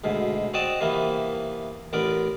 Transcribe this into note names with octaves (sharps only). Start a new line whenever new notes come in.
D2 G#2 B2
C4 F#4 D5 D#5 A5
C3 E3 A#3 B3
A1 B3 A#4 D5